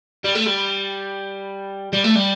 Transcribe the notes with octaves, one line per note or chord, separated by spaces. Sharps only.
G3
A3
G3
G3
A3
G3